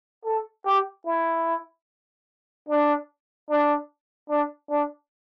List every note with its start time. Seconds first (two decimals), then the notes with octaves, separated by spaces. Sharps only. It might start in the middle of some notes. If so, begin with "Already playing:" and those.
0.25 A4
0.66 G4
1.06 E4
2.69 D4
3.49 D4
4.29 D4
4.70 D4